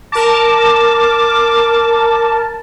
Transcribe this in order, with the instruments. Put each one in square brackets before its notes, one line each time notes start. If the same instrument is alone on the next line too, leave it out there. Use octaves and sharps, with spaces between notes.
[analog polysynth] A#4 A5 [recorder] D6